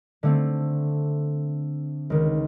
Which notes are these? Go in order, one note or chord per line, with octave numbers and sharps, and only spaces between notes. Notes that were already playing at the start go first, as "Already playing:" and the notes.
D3 A3 C4
C#2 D#3